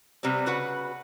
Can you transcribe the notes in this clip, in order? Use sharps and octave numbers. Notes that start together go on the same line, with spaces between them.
C3 G3 B3 C4
C#3 F#4 B4 F#5